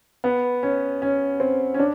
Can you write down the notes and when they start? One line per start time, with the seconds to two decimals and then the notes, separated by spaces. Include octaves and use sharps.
0.24 B3
0.63 C#4
1.02 C#4
1.40 C4
1.74 C#4
1.79 D4